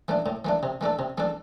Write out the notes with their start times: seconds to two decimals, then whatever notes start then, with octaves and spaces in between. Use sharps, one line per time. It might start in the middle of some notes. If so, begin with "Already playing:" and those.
0.08 E3 A3 D4
0.26 A2
0.45 E3 A3 D4
0.63 C3
0.81 E3 A3 D4 A4
0.99 C3
1.18 E3 A3 D4 A4